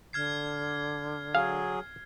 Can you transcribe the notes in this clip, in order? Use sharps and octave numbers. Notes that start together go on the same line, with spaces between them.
D3 F6 G#6 C7
F#3 G#4 F5